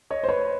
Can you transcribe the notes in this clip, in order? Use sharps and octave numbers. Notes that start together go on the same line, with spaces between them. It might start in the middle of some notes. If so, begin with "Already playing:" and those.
C#5 D#5
C5
B4 C#5